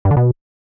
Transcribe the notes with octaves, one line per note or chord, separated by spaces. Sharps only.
G2
D3
B2